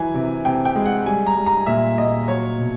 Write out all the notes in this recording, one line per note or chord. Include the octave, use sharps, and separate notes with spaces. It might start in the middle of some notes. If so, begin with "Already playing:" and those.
Already playing: E3 F#3 G#5
C3
C3 G5
G5
G#3
F#5
G3 G#5
A#5
G3
A#5
A#2 E5
A#2 D#5
F#3 C#5
B2